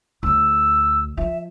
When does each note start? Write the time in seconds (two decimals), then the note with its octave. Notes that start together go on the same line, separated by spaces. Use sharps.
0.23 D2 E6
1.17 F3 E5